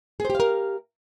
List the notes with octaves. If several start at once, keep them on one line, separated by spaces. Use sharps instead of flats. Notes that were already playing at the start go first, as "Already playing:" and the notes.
G4 G#4 A#4 C5 F5